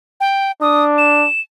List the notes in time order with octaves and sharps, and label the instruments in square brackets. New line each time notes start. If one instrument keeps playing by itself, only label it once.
[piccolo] G5
[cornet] D4 [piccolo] D#6
[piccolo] E7